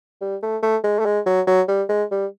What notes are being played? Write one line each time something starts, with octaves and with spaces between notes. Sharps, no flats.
G3
A3
A3
G#3
A3
G#3
F#3
F#3
G3
G#3
G3